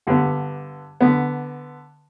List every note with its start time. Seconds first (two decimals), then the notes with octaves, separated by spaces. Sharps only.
0.07 G2 D3 B3
1.01 D3 B3